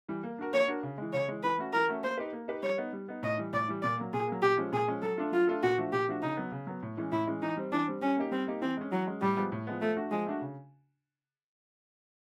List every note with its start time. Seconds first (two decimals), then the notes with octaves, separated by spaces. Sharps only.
0.08 E3 G3
0.23 A#3
0.38 D4 F#4 A#4
0.53 A#3 C#5
0.68 D4 F#4 A#4
0.83 C#3
0.98 E3 G#3
1.13 C#3 C#5
1.28 E3 G#3
1.43 E3 B4
1.58 A3 C#4 F#4
1.73 E3 A#4
1.88 A3 C#4 F#4
2.03 A#3 C5
2.18 D#4 G4 B4
2.33 A#3
2.48 D#4 G4 B4
2.63 G3 C#5
2.78 B3 D#4
2.93 G3
3.08 B3 D#4
3.23 A2 D#5
3.37 E3 G3
3.53 A2 D5
3.68 E3 G3
3.82 A#2 D5
3.98 F#3 A#3
4.13 A#2 G#4
4.28 F#3 A#3
4.42 A#2 G4
4.57 F3 G#3 C#4
4.72 A#2 G#4
4.88 F3 G#3 C#4
5.02 F#3 A4
5.18 A3 D4 F4 A4
5.32 F#3 F4
5.47 A3 D4 F4 A4
5.63 A#2 F#4
5.78 F3 A3 D4 F#4
5.92 A#2 G4
6.08 F3 A3 D4 F#4
6.22 C#3 D#4
6.37 F#3 B3
6.52 C#3
6.67 F#3 B3
6.82 A2
6.97 E3 G#3 C#4
7.12 A2 E4
7.27 E3 G#3 C#4
7.42 E3 D#4
7.57 G3 C4
7.72 E3 D4
7.87 G3 C4
8.01 G3 C#4
8.17 A#3 D#4 G4
8.31 G3 C4
8.47 A#3 D#4 G4
8.61 E3 C4
8.77 G#3 C#4
8.92 E3 F#3
9.07 G#3 C#4
9.21 A2 G3
9.37 F3 G#3 B3
9.52 A2
9.67 F3 G#3 B3
9.81 F3 A3
9.96 A3 D4 F#4
10.11 F3 G#3
10.26 A3 D4 F#4
10.41 C#3